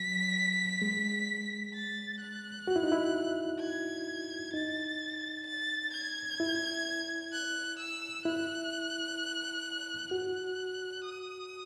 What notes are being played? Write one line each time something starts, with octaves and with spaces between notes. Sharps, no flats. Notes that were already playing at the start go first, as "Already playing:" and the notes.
Already playing: F#3 B6
G#3
A6
F#6
F#4
E4
D#4
E4
G#6
D#4 A6
A6
G#6
E4
F#6
E6
E4 F#6
F#4 F#6
D#6